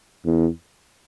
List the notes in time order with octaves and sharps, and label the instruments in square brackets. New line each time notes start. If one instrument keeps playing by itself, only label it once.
[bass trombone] E2